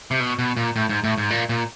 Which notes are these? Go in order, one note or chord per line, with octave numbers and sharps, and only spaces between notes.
C3
B2
B2
A#2
A2
G#2
A2
G#2
A#2
A#2